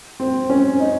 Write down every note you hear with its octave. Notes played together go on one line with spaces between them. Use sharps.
C4
C#4
D#4